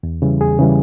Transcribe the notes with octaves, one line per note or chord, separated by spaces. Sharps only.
E2
C#3 E3 G3
E2 G#4
C#3 E3 G3